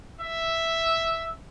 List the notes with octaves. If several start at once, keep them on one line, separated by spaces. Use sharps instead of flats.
E5